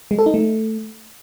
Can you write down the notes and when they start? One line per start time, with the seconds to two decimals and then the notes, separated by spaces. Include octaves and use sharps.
0.11 G#3
0.19 A4
0.26 D#4
0.34 A3